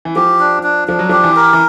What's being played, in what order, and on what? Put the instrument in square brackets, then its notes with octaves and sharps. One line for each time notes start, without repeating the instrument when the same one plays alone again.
[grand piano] E3
[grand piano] F3 [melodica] G4
[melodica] D4
D4
[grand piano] F3 [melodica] D4
[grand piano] F#3
[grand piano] F3 [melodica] G4
[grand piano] E3
[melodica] A#4
[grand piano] E3